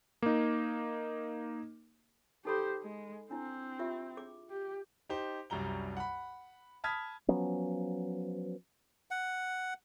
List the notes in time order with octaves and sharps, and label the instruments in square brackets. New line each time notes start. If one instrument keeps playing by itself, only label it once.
[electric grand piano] A#3 D#4
[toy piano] D#4 A4 B5 [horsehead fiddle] G4 C5
[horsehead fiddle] G#3
[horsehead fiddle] C4 [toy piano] D4 E4
[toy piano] F4 G4 E5
G#4 D6
[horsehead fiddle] G4
[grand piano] D#4 G4 C5
C2 F#2 G3 A#5 G7
F#5 B5
A5 B5 D#6 F6 G#6 B6
[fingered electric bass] F3 F#3 B3 C#4
[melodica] F#5